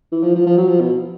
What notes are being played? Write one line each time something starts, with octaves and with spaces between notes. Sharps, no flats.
E3
F3
F3
F3
F#3
F3
B2